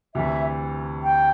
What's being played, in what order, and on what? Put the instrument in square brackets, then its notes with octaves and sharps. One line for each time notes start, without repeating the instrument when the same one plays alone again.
[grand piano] D2 C3 E3 [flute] E5
[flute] G5